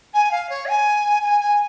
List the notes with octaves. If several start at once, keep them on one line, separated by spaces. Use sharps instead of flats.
G#5
F5
C#5
G#5
G#5
G#5